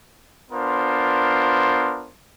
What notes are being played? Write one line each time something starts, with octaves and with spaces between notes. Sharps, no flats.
B3 D4 F4 A#4 C5